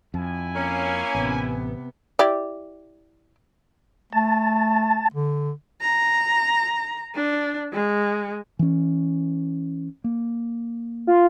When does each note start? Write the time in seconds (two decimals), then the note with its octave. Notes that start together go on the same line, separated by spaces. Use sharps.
0.14 F2 E4 G#5
0.56 A#3 C#4
1.15 A1 C3 B3
2.19 E4 G4 D5
4.13 A3 A5
5.14 D3
5.81 A#5
7.15 D4
7.73 G#3
8.59 E3 C#4
10.04 A#3
11.07 F4